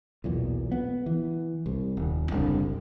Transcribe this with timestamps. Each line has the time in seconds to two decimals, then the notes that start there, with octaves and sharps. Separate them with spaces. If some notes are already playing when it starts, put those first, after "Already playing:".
0.24 B1 E2 A#2
0.72 B3
1.06 E3
1.66 C2
1.97 D#1
2.31 F#1 C2 B2 D3